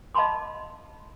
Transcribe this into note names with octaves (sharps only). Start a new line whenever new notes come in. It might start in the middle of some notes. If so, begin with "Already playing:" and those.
D#5 F5 A5 B5 C6 D6